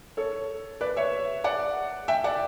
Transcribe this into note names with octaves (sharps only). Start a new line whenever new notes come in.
A4 C#5
B4 D5
C#5 E5
D5 F#5
E5 G5
D5 F#5